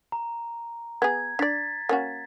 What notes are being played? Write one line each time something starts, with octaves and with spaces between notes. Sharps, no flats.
A#5
B3 G#4 G#6
D4 D5 A6 B6
A#3 C#4 F#4